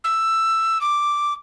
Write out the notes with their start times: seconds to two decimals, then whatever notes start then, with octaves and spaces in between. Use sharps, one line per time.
0.04 E6
0.81 D6